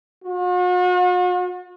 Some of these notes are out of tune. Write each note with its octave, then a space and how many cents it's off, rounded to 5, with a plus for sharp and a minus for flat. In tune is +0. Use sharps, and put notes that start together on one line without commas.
F#4 -45